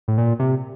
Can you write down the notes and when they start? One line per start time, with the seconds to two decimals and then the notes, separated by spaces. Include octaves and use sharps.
0.08 A2
0.18 A#2
0.39 C3